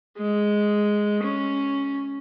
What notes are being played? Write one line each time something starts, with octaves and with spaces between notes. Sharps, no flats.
G#3
C#4